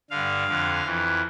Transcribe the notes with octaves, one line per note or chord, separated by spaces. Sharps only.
G2 D3 F5
F2 D3
F2 E3